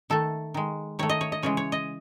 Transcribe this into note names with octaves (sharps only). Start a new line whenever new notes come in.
D#3 A3 A4
D#3 G#3
D#3 A3 C#5
D#5
C#5
D#5
C#3 E3 G#3 C#5
C#5
D#5